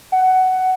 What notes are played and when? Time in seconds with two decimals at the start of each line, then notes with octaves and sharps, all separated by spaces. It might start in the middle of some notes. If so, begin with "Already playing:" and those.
0.12 F#5